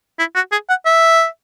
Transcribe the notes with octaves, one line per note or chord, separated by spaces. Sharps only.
E4
F#4
G#4
F#5
E5